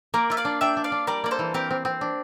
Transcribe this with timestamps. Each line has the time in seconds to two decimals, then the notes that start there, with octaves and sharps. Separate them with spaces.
0.14 A#3 A#4 D5
0.30 F4 E5
0.37 D5 F5
0.45 D4
0.61 D4 E5 G5
0.77 D4
0.84 D5 F5
0.92 D4
1.07 G3 A#4 D5
1.24 A#3 D5
1.31 A4 C5
1.39 E3
1.54 C4 G4 A#4
1.70 C4
1.85 C4
2.01 D4